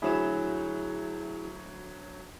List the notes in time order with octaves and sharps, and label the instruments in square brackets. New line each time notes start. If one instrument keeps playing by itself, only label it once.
[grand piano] D2 F#3 E7 [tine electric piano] E4 G#4